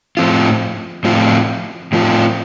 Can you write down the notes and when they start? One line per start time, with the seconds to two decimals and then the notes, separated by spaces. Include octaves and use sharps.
0.17 A2 F3 C4 F4
1.05 A2 F3 C4 F4
1.93 A2 F3 C4 F4